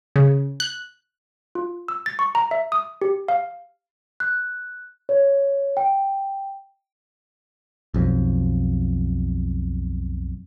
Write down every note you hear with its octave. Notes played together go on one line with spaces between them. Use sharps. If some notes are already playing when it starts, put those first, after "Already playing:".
C#3
F#6
F4
E6
A6
C#6
A#5
E5
D#6
G4
F5
F#6
C#5
G5
B1 F2